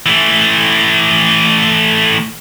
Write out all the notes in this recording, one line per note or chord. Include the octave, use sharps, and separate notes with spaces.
E3 A3